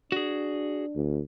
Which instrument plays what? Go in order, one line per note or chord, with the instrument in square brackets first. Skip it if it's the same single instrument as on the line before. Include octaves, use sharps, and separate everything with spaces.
[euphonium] D4 [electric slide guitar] F#4 G#4
[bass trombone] D2